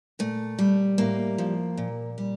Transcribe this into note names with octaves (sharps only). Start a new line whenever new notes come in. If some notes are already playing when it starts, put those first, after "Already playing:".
A#2 A3
G3
A2 A#3
F3
A#2
G3